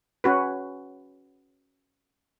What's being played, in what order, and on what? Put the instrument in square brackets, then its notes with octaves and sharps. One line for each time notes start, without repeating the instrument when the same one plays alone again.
[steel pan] C#4 F#4 B4